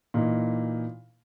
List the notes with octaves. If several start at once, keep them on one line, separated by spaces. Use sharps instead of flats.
A#2 E3 A#3 D#4